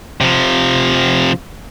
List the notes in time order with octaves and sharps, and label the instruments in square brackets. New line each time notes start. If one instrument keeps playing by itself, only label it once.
[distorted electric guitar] C3 F3